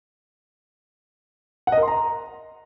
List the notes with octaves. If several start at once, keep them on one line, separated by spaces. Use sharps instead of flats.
F#5
D#5
A#4
C6
A#5